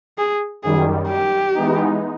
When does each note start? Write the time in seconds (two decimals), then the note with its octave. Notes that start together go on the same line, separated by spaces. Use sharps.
0.18 G#4
0.63 F#2 D#3 G3 G#4
1.09 G4
1.54 E3 G#3 B3 D#4